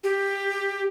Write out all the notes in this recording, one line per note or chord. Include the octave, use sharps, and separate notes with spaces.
G4